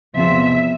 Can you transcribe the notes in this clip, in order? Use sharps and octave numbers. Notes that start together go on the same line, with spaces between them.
E2 C3 F3 E5